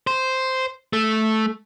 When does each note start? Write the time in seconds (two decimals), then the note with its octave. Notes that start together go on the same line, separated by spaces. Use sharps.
0.07 C5
0.93 A3